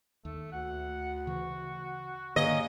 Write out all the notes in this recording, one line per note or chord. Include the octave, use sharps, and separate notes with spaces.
D#2 A3
D2 F#5
C#3 E3 F#4
G#2 D3 D#3 A#3 C#4 D#5